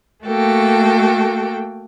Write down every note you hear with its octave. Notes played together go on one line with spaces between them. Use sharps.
A3 A#3 F#4 A4 G5